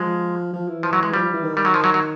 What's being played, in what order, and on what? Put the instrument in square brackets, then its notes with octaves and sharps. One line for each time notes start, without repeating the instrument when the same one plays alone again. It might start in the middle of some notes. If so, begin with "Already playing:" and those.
Already playing: [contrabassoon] F3 [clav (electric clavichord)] G#3
[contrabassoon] F3
E3
[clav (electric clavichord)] F3
F#3
G#3
[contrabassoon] F3 [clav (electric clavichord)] G3
[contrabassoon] F3
E3
D#3
[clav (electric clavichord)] G3
F#3
F3
F#3
F#3